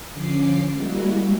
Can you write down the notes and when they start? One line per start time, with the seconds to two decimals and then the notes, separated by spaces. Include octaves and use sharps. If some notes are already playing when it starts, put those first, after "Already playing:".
0.13 D3 F3 C#4 D6 C7
0.72 G3 G#3 A#3 E4 F#4